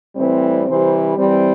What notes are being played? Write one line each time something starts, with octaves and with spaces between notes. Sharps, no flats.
A2 E3 G3 C4
C3 E3 G3 C5
E3 G3 C4